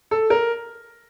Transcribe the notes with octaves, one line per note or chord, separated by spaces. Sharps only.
A4
A#4